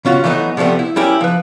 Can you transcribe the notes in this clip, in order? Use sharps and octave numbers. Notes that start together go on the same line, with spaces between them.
C#3 C#4 F4 F#4
E3 F#3 A3 B3 D#4
C3 F3 G3 A3 B3
E4
G3 C#4 E4 G4 A#4
F3 B4